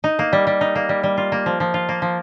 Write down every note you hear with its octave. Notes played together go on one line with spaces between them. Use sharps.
D#4
A#3
G3
G3
D#4
A#3
G3
G3
F4
A#3
F3
F3
F4
A#3
F3